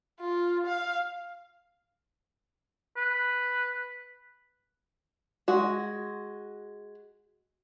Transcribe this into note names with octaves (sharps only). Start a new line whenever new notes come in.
F4
F5
B4
G#3 F#4